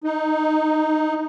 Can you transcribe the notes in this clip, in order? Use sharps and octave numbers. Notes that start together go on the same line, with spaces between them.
D#4